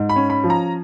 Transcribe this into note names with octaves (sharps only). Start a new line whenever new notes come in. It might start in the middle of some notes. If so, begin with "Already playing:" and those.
Already playing: G#2
B5
C#4
B5
F3
A#5